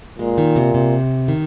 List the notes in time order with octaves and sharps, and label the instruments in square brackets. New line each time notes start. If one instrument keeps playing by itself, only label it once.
[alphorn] A#2 [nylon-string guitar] G#3
[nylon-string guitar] D#3
C3
C3
D#3